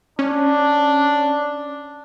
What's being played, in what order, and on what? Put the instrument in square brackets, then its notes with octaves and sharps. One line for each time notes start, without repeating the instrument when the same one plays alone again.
[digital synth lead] C#4 [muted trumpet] D4